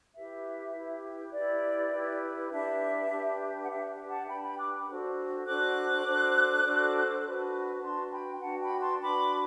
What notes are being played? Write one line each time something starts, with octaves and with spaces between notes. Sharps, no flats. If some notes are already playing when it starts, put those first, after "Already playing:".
E4 G4 B4 E5
E4 G4 B4
E4 G4 B4 D5
E4 G4 B4
D4 G4 B4 E5
D4 G4 B4
F#5
D4 G4 B4 E5
F#5 A5
D4 G4 B4 G5 B5
G5 B5
D6 F#6
D4 F#4 A4 C5
D4 F#4 A4 C5 D6 F#6
D4 F#4 A4 C5
D4 F#4 A4 C5
D4 F#4 B4
D4 F#4 B4 A5 C6
G5 B5
D4 F#4 B4 F#5 A5
G5 B5
A5 C6
D4 F#4 B4 B5 D6